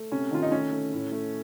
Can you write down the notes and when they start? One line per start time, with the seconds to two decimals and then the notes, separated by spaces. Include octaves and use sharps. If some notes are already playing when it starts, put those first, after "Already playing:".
Already playing: A3
0.12 C3 C#4
0.31 D#3 F4
0.42 D#4
0.52 A3 C#4
0.71 A3
0.93 A2
1.12 A3